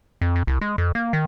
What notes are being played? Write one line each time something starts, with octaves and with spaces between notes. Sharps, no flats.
F2
F2
C2
G#3
F2
A#3
D#3